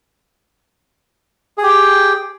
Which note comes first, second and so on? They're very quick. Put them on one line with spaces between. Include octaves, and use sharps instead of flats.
G#4 G4 G5